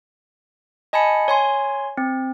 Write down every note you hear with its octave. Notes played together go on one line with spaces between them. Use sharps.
D#5 G#5 A5 B5 C#7
C#5 G#5 C6
C4